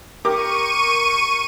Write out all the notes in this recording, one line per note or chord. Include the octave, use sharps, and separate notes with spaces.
G4 A#4 C#6 D6 D#7